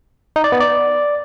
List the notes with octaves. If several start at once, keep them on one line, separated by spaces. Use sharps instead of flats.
D#4
D5
B3
D5